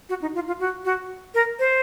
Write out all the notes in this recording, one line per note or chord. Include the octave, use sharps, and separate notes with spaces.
F#4
D#4
F4
F4
F#4
F#4
A#4
C5